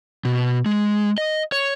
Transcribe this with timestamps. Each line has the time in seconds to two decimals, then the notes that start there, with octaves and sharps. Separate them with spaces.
0.25 B2
0.66 G#3
1.18 D#5
1.52 C#5